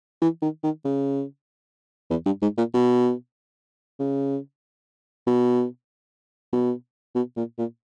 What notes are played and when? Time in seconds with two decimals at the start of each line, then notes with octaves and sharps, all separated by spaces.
0.21 E3
0.42 D#3
0.63 D#3
0.85 C#3
2.10 E2
2.25 G2
2.42 G#2
2.57 A#2
2.74 B2
3.99 C#3
5.26 B2
6.52 B2
7.15 B2
7.36 A#2
7.58 A#2